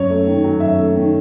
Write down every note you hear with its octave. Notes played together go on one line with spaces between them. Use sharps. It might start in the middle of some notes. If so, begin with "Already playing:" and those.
Already playing: F#2 F#3 C#5
A3
D#3
F#3
F#2 E5
A3
D#3